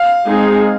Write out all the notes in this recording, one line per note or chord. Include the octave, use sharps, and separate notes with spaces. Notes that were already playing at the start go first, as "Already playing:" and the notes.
Already playing: F5
G#3 C4 D#4 G#4